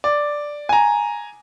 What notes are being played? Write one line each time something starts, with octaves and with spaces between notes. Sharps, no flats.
D5
G#5 A#5